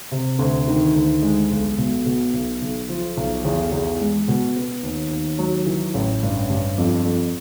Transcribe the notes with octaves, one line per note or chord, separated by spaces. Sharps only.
C3
D2
D#3
D2
G#3
B1
B2
B2
B1
B1
F3
B1
E2
E2
G#3
B2
B3
D#2
D#2
F#3
E3
A1
G2
G2
F2
F2